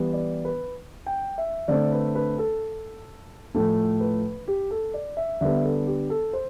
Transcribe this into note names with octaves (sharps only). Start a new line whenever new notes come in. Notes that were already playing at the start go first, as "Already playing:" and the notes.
Already playing: E3 G3 B3
D5
B4
G5
E5
D3 A3 C4 D5
B4
B4
A4
A2 F3 A3 A4
B4
G4
A4
D5
E5
D3 G3 B3 E5
A4
G4
A4
C5